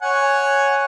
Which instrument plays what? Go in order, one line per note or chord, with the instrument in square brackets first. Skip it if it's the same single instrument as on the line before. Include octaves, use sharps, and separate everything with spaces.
[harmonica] C#5 F#5 G#5